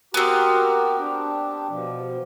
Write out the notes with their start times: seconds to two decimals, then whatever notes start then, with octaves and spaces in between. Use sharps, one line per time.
0.14 B3 C4 F#4 G4 A#4
0.99 D4 G4
1.69 B2 F3